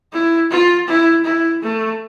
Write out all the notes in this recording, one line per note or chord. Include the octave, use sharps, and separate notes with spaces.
E4
F4
E4
E4
A3